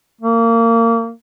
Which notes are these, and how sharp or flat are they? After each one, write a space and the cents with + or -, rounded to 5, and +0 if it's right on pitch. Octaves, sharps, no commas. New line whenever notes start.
A#3 -25